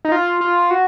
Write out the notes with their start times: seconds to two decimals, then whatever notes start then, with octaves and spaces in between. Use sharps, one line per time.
0.05 D#4
0.12 F4
0.41 F4
0.71 F#4